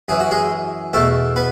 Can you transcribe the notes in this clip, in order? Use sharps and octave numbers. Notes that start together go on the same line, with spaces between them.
F#2 E3 G#4
F#4
G#3 G#4
E2 B2 A3 A4
B3 B4